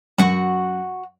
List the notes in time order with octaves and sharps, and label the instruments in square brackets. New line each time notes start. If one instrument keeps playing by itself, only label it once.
[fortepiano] F#2 [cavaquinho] F#4 F#5 C#6